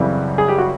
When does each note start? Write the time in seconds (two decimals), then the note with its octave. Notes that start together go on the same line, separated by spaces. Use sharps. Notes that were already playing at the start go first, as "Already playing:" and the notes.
Already playing: F#2 C#3 E3 G3 C4
0.38 G#4
0.48 G4
0.58 F#4